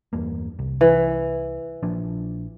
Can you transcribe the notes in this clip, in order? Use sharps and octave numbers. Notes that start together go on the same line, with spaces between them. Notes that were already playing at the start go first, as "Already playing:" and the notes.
E2 G2 A#3
C2
E3
A#1 F3 D4